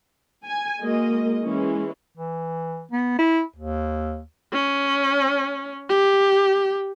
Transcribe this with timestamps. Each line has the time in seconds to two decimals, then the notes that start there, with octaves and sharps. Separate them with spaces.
0.44 G#5
0.81 G#3 A#3 F#4 D#5
1.41 E3 G#3 C#4
2.18 E3
2.92 B3
3.19 E4
3.56 D#2
4.53 C#4
5.89 G4